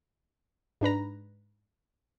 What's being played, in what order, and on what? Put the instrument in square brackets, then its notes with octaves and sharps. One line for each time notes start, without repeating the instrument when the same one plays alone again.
[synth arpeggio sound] G#2 D4 B4 A#5